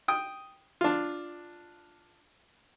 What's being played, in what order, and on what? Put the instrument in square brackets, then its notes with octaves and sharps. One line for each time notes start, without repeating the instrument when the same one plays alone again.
[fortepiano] G5 D#6
D4 F4